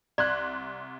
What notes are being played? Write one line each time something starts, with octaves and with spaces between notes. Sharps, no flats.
C2 D5 C6 F#6